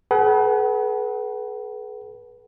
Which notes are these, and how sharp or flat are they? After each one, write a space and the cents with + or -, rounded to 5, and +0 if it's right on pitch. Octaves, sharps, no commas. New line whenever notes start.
G#4 +40 B4 -25 F#5 +35